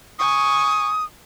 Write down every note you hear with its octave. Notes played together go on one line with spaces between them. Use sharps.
G#5 C#6 D#6